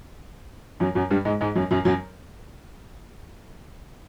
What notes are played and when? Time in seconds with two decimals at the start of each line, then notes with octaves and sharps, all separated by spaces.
0.80 F#2 F#3
0.95 F#2 F#3
1.11 G2 G3
1.25 G#2 G#3
1.41 G#2 G#3
1.56 F#2 F#3
1.71 F#2 F#3
1.85 F#2 F#3